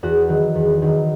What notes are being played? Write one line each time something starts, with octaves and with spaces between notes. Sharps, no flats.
E2 F#4
D#3 F#3
E2
D#3 F#3